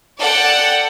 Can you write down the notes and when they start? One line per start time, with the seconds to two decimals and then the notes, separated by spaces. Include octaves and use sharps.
0.19 A4 D5 F#5 G5